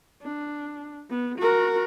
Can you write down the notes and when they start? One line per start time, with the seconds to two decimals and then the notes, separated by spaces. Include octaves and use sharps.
0.23 D4
1.10 B3
1.39 F#4 A#4